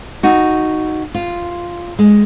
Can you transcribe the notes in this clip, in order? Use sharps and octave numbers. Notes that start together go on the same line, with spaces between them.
D#4 F#4
F4
G#3